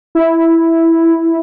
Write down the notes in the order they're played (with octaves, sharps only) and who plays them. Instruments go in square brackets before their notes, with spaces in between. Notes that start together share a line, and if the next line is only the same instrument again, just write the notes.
[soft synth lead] E4